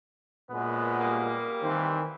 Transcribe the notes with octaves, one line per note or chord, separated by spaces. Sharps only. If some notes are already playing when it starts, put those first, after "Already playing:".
F#2 A#2 G#3 B3
G3 A#3
C2 D#3 E3 C4